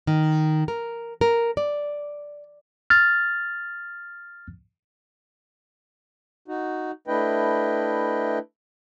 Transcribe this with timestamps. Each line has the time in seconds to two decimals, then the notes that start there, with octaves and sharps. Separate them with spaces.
0.07 D#3
0.68 A#4
1.21 A#4
1.57 D5
2.90 F6 A6
6.48 D#4 F#4
7.07 A3 D4 E4 B4 D#5 G5